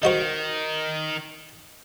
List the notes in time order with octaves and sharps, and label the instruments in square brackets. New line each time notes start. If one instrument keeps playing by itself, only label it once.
[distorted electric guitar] D#3 [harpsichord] D#4 F#4 C5